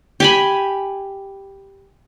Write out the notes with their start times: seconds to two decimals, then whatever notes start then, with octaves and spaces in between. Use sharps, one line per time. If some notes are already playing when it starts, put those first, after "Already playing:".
0.20 G4 G#5 B5